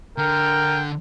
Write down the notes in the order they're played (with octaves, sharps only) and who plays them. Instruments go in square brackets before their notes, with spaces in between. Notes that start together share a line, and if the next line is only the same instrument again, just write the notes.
[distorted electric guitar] D3 [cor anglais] A#4 [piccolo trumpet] G5